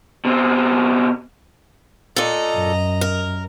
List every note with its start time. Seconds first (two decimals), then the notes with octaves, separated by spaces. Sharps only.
0.25 B2 C4
2.16 A#2 A4 D#5 A#5
2.56 F#2
3.01 A#4